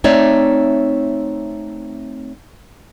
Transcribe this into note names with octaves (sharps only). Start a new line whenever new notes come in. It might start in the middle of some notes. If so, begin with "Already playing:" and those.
A3 C4 D#4 C#5 D5 E5